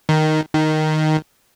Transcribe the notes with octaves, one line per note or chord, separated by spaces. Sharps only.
D#3
D#3